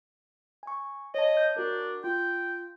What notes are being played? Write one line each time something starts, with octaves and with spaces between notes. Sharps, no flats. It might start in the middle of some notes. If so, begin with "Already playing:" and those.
G#5 C#6
C#5 D#5 A5
G6
D4 F#4 A#4
F4 G5